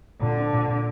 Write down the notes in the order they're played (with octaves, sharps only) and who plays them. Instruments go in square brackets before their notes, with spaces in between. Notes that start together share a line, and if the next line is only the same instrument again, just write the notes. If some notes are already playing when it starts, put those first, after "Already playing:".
[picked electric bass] A#2 [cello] D3
[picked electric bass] D4
A#2
A#2